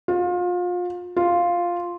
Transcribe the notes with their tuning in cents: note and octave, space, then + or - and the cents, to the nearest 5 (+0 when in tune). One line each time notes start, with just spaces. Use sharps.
F4 +30
F4 +0